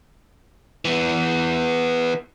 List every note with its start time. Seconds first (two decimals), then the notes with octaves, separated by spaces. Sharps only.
0.85 E3 B3